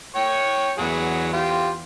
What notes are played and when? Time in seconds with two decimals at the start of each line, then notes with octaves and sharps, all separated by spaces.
0.16 C#5 G5 C#6
0.78 E2 F#3 B3 G#4
1.33 F4 G4